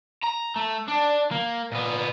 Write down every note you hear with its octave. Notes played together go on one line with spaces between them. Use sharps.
A#5
A3
D4
A#3
A#2 B3